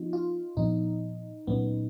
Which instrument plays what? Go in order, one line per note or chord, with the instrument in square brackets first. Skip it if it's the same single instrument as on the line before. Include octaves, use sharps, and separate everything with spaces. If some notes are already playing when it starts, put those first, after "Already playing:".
Already playing: [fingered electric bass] F3 B3 [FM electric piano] D#4 F4
[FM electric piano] F4
[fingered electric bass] A#2 F3 B3 [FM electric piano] D#4
[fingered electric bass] A#2 F#3 A#3 C#4 [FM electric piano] B3